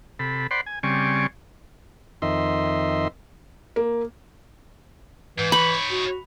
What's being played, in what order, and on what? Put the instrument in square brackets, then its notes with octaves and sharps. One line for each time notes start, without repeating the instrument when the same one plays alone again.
[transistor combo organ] C3 A4 B5
C5 D5 F#5 B5 C6
G#5
C#3 G3 C4 D5 G#5 C#6
F2 D#3 D#5 E5 C6
[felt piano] A#3
[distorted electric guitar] G#2 [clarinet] E3
[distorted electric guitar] D#4 C#5 [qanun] B5
[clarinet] F#4